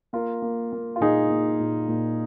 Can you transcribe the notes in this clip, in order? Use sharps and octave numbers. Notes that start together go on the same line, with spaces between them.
A#3 F4 A#4
A#3
A#3
F4
A#2 D#4 G#4
A#3
A#2
A#2